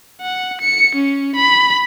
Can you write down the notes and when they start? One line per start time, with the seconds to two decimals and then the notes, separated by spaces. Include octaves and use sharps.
0.21 F#5
0.61 C#7
0.95 C#4
1.35 B5